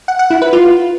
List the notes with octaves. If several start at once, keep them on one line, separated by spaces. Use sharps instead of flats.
F#5
F#5
E4
B4
F4